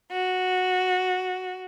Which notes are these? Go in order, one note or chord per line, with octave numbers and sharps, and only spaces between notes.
F#4